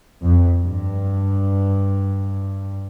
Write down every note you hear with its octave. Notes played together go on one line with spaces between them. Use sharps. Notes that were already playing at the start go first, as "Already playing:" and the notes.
F2
G2